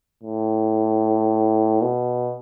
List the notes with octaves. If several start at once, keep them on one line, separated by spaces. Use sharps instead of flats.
A2
B2